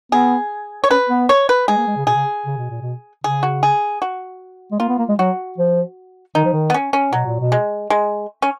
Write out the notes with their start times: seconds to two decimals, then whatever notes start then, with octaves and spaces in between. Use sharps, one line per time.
0.12 B3 G#4
0.84 C#5
0.91 C#4 B4
1.10 B3
1.29 C#5
1.49 B4
1.68 G#3 G#4
1.78 A#3
1.87 G#3
1.97 C#3
2.06 B2 G#4
2.15 C#3
2.46 C#3
2.58 B2
2.70 A#2
2.81 B2
3.24 C#3 G#4
3.43 F#4
3.63 G#4
4.02 F#4
4.72 G#3
4.80 A#3 F4
4.89 B3
4.99 A#3
5.09 G#3
5.19 F#3 F#4
5.58 F3
6.35 D#3 D#4
6.45 F3
6.53 D#3
6.70 B3
6.74 C#4
6.93 C#4
7.13 B2 F#3
7.26 A#2
7.40 B2
7.52 G#3
7.90 G#3
8.42 C#4